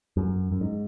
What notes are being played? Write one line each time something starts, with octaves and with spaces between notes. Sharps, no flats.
F#2
F#2
G#2